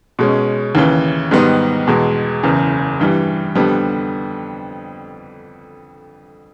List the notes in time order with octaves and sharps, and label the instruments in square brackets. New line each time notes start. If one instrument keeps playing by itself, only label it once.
[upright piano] B2 G#3 C#4
D#2 C#3 E3
G#2 D#3 G3 B3 D#4
E2 B2 G#3
F#1 E2 C#3
G2 E3 G3
F2 D3 G3 B3